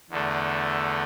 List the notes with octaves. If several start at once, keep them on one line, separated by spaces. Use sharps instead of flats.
E2 D3 A3